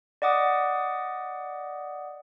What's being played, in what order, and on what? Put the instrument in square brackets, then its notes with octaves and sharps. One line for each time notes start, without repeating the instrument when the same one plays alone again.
[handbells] D5 D#5 F#5 D6 D#6